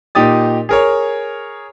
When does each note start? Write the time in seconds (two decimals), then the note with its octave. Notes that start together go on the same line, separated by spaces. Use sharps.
0.15 A#2 D#4 G4 D#6 A6
0.69 G#4 A#4 C#5